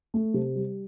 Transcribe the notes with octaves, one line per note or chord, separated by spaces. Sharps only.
A3
C3
G3